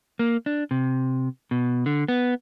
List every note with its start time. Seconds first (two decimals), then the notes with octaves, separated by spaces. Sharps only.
0.19 A#3
0.46 D4
0.71 C3
1.51 B2
1.86 D3
2.08 B3